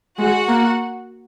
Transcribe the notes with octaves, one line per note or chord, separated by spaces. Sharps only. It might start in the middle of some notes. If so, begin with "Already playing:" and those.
G#3 F#4 F#5
A#3